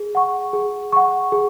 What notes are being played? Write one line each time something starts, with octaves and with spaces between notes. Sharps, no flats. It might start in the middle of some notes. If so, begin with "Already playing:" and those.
Already playing: G#4
F#5 C#6
G#4
F#5 C#6
G#4